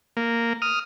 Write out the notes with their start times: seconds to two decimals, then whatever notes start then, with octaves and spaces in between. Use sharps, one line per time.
0.17 A#3
0.62 D#6 F6